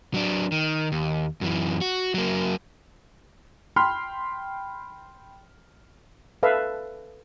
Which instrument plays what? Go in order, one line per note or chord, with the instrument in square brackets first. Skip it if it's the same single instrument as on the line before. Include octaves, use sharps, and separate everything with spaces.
[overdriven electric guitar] F#3 D4
D#3
D#2
F#2 E3
F#4
F#3 A#3
[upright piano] G5 B5 C6 F6
[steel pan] A4 B4 E5 F5